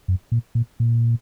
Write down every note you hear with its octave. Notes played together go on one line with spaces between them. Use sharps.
F#2
A#2
A#2
A#2